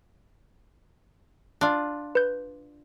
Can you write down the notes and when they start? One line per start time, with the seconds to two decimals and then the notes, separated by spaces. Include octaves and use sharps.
1.61 D4 F4
2.15 B4 G6